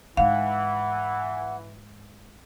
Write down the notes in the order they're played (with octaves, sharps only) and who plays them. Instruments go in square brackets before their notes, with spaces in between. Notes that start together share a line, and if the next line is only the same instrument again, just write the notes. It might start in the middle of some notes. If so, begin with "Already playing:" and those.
[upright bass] G#2 G#3 [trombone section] E3 [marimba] F5 [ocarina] F#5